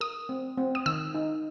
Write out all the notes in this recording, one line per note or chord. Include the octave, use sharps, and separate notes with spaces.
A#4 D#6
C4
C4
D#6
D#3 E6
D#4